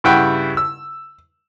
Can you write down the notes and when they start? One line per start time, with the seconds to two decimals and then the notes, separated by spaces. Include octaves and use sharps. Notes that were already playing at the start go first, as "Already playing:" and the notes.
0.04 G2 C#3 E4 F#5 G5
0.57 E6